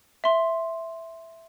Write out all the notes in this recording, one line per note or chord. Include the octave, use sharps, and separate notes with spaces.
E5 C6